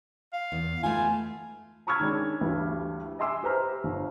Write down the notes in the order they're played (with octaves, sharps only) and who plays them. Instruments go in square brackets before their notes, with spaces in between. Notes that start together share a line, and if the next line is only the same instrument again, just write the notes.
[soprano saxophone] F5
[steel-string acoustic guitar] E2
[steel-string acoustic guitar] A3 B3 F4 [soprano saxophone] G#5
[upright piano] A#5 B5 C#6 E6 F6 G#6
D#3 G#3 C#4 D4
D2 G2 E3 G3
D#5 E5 G#5 C6 D6 E6
G4 B4 C5 A#5 F6
G1